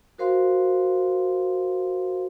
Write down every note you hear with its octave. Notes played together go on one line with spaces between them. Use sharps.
F#4 A#4 C5 F5 C6